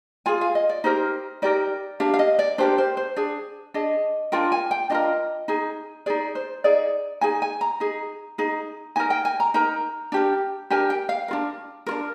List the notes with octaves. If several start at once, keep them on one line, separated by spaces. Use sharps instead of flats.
F4 G#4 G#5
F5
D#5
D5
D#4 G4 A#4 C5
D#4 G4 A#4 D5
D4 G4 A#4 F5
F5
D#5
D5
D4 G4 A#4 C5
C5
C5
D4 G#4
D4 G#4 D#5
D4 F4 A#4 G5
G#5
G5
D4 F4 A#4 D#5
D#4 G#4
D#4 G#4 D5
C5
D#4 G#4 D5
D#4 G#4 G#5
G#5
A#5
D#4 G#4
D#4 G#4
D#4 A#4 G#5
G5
G#5
A#5
D#4 A#4 A#5
D4 G4 A#4
D4 G4 A#4 G#5
G5
F5
D4 F4 A#4
D4 F4 A#4